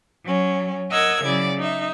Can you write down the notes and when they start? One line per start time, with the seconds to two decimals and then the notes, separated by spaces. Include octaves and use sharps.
0.24 F#3 C#4
0.91 A#4 D#5 F#5 E6 G#6
1.24 C#3 F#3 E4 D5
1.57 D#4 E5